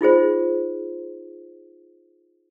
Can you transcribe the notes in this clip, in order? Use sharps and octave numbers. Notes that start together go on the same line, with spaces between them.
D#4 F4 G#4 C5